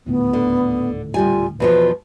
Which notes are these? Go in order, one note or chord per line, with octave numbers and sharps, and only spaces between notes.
D#1 D2 A2 B3
D3
C3 G3 F4 G#5
E2 B2 F3 B4